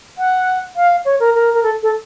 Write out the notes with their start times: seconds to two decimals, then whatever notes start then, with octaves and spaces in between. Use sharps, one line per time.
0.18 F#5
0.75 F5
1.05 C#5
1.19 A#4
1.34 A#4
1.53 A#4
1.63 A4
1.82 A4